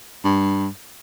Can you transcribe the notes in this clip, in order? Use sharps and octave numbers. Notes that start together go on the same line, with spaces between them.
G2